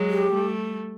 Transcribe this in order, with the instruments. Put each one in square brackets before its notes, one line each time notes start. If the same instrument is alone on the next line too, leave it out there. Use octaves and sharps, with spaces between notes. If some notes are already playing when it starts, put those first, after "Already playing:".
Already playing: [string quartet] F#3 G#3
[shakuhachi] G4
[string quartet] G3 A3